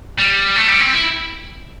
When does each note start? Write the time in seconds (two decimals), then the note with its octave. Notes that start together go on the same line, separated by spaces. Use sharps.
0.18 G3
0.56 A3
0.68 G3
0.80 C4
0.93 E4